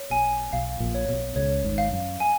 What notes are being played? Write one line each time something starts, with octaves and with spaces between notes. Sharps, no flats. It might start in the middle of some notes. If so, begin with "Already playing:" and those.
Already playing: C#5
B1 B2 G#5
B1 B2 F5
A#1 A#2
C#5
B1 B2
C#2 C#3 C#5
G#1 G#2
F5
F#2
G#5